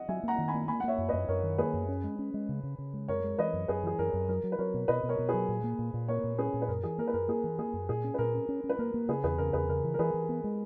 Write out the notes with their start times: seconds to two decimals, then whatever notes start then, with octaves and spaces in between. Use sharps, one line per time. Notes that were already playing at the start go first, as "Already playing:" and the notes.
Already playing: D#5 F#5
0.09 F#3 E5 G#5
0.23 A#3 F#5 A#5
0.38 D#3
0.48 G#5 B5
0.54 A#3
0.68 A#3 G#5 B5
0.80 F#5
0.84 A#3 C#5 E5
0.98 F#2
1.09 F#2 B4 D#5
1.28 F#2 A#4 C#5
1.43 D#3
1.58 A#3 G#4 B4
1.74 F#2
1.88 C#4
2.04 G#3
2.19 C#4
2.34 G#3
2.49 C#3
2.63 C#3
2.78 C#3
2.94 G#3
3.08 F#2 A#4 C#5
3.24 G#3
3.39 E3 B4 D#5
3.53 F#2
3.68 F#2 G#4 B4
3.83 E3 G#4
3.99 F#2 A#4
4.13 F#2
4.29 F#3 A#4
4.44 F#3
4.52 B4
4.59 F#3 A#4 C#5
4.74 B2
4.88 B2 B4 D#5
5.03 B2
5.09 A#4 C#5
5.19 B2
5.29 F#3 G#4 B4
5.49 A#2
5.64 A#3
5.79 A#2
5.94 A#2
6.08 A#3 A#4 C#5
6.24 A#2
6.38 C#4 G#4 B4
6.54 A#2
6.62 B4
6.68 F#2 A#4
6.84 E3 G#4
6.98 A#3 A#4
7.07 B4
7.14 F#2 A#4
7.28 A#3 G#4
7.44 E3
7.59 A#3 G#4
7.73 F#2
7.89 A#2 G#4
8.04 C#4
8.14 B4
8.19 A#2 A#4
8.34 C#4
8.49 C#4
8.64 C#4
8.69 B4
8.79 A#3 A#4
8.94 A#3
9.09 C#3 G#4 B4
9.24 E2 G#4 B4
9.38 C#3 A#4
9.53 E2 G#4 B4
9.69 C#3 A#4
9.84 E3
9.94 A#4
9.99 E3 G#4 B4
10.14 E3
10.29 B3
10.44 G#3